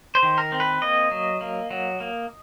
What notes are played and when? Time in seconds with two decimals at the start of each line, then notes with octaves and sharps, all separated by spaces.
0.15 C5
0.23 D#3
0.38 A#4
0.52 C4
0.60 B4
0.82 A#3 D#5
1.11 F#3
1.41 A#3
1.71 F#3
2.00 A#3